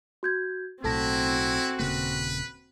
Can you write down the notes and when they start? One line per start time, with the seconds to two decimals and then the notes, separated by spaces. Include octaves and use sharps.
0.23 F#4 G6 G#6
0.84 B1 A2 C4 E4 F#4 A4 A5 A#6
1.80 D#1 C#3 A#3 B4